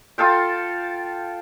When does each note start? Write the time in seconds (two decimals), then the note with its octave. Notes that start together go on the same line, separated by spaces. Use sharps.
0.18 F4 A4 F5 G5